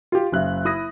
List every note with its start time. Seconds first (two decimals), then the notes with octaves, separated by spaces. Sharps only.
0.12 F4 G4
0.32 F#1 C#3 E5 F#6
0.65 E4 D#6 A#6